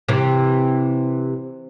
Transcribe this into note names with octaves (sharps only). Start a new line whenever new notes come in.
C3 E3